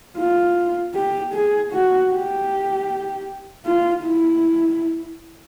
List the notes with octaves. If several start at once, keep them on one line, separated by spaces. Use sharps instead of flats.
F4
G4
G#4
F#4
G4
F4
E4